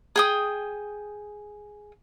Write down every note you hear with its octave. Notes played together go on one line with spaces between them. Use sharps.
G#4 G5 D#6